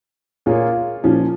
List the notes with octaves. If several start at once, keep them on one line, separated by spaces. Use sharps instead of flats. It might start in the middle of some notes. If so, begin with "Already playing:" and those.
A#2 A#3 F4 G#4 C#5
A#2 F3 C#4